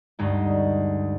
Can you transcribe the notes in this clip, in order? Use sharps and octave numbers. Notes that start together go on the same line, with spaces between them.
D2 G2 G#3 D#4